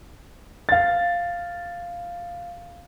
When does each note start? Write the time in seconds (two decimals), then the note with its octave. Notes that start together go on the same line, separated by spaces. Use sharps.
0.69 F5 A6